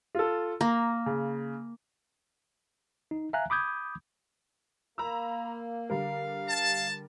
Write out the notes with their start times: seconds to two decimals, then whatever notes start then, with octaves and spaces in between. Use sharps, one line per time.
0.15 F4 A4
0.61 A#3 A#5
1.06 C#3
3.11 D#4
3.33 E5 F5 G#5 A#5 F#6
3.50 B5 D6 D#6 G6 G#6
4.98 A#3 A#5 B5 E6
5.90 D3 G3 A#4 F5
6.49 A5